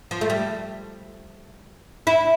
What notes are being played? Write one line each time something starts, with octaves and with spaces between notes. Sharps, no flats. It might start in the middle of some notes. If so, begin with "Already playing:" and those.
F3
A3
G3
E4